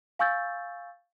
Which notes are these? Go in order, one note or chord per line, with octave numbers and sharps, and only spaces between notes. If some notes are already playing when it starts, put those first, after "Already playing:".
F5 G#5 C#6 E6 G6 A6